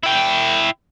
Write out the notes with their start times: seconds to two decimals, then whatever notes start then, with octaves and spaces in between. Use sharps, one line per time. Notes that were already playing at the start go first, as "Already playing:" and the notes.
0.04 E4 G5